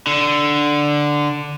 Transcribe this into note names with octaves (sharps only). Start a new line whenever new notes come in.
D3